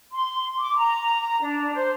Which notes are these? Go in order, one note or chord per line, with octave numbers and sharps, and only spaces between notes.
C6
D6
A#5
D4
C5